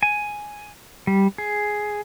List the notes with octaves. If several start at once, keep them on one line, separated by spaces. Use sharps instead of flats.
G#5
G3
G#4